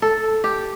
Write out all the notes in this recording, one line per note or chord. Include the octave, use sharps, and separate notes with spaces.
A4
G4